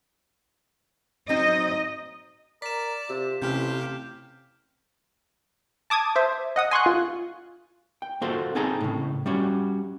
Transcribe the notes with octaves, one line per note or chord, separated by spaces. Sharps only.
F#3 C4 D#4 D#5
A#4 D5 B6 E7
C3 F4
A1 C3 G4 F6 G6
A5 D6 D#6 G#6
C5 E5
D#5 F#5 D#6
G#5 C6 C#6 F#6
F4
G5
A#3 F4 F#4 A4 C5
C4 D#4 G#4 A4 G#5 A#5
A2 C#3
G3 C#4 F#4